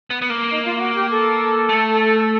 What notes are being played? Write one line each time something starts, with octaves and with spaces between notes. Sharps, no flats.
B3
B3
A#3
D#4
F4
F4
F#4
G4
A4
A3